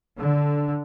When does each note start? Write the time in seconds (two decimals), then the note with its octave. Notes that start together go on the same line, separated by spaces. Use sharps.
0.18 D3